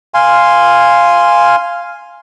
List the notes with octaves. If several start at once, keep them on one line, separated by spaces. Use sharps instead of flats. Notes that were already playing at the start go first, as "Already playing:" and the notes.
F5 G#5 C6